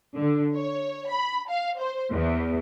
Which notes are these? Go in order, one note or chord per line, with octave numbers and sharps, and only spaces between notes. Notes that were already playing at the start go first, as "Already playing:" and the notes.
D3
C#5
B5
F5
C5
E2